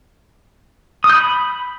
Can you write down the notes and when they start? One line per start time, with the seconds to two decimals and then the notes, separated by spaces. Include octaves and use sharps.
1.04 D#6
1.10 G6
1.15 B5